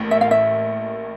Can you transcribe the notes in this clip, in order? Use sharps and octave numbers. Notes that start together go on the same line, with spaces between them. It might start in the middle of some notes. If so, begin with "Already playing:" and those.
Already playing: A1 A2 A#3
E5
F5
E5